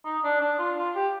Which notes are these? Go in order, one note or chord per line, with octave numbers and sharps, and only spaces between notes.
D#4
D4
D4
F4
F4
G4